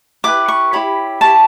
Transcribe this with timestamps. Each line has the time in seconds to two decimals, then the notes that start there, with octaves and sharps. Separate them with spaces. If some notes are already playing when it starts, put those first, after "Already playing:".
0.24 E4 G4 B4 D6
0.48 C#6
0.73 E4 G4 C#5 B5
1.21 E4 G4 C#5 A5